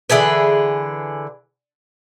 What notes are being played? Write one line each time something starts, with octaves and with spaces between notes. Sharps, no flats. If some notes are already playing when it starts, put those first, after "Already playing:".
D3 E3 G#4 B4